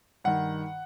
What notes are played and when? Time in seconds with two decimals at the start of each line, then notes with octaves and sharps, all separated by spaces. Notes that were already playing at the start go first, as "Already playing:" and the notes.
0.24 G2 D#3 F#5